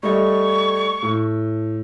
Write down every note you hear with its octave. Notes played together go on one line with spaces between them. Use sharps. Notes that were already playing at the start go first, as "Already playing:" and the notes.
G3 A3 D#5 C#6
A2